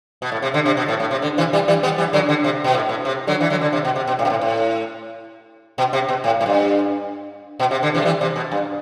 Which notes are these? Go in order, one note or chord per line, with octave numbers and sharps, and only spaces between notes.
B2
A2
C3
D3
C3
B2
A2
A2
C3
D3
C3 E3
E3 G3
E3 G3
G3 B3
E3 G3
D3 F#3
D3
C3
B2
A2
A2
C3
D3 F#3
E3
D3 F#3
D3
C3
B2
C3
B2
A2
B2
A2
A2
B2
C3
B2
A2
A2
G2
B2
C3
D3
C3 E3
A3
E3 G3
C3
B2
G2